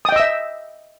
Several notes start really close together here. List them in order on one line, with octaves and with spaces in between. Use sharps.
D#6 G5 D#5 E6 E5